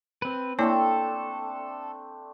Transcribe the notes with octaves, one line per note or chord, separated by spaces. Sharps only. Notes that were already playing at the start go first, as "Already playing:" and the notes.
C4 B4
A3 A#3 C4 D4 E4 A4 C#5